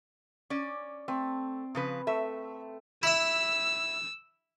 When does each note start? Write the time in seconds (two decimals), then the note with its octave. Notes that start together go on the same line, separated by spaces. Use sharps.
0.50 C#4 D5
1.08 A3 C4
1.75 C#3 F3 B4
2.07 A3 E5
3.03 E4 E5 E6